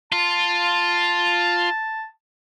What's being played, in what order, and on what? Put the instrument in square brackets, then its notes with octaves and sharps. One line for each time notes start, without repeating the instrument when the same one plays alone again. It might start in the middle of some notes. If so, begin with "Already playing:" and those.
[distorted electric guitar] F4 [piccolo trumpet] A5